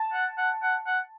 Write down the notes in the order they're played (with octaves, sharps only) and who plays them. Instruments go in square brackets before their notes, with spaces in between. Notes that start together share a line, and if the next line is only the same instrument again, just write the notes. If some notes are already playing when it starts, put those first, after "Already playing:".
Already playing: [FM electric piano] A5
[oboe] F#5
F#5
F#5
F#5